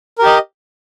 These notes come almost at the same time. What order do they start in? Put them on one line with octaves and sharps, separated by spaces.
A#4 G4 D#5